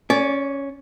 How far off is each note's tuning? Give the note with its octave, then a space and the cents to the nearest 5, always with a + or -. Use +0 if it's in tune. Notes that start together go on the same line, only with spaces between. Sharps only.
C#4 +0 D5 -25